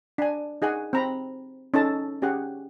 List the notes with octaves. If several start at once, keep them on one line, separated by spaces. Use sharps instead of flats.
D4 G#5
D#4 G#4 F#5 G#5
C4 A#5 B5
C#4 D#4 A4 A5
C#4 G4 G#4 F#5